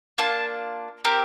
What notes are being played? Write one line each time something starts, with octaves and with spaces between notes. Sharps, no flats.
A#3 D4 F4 A5
C4 G4 A#4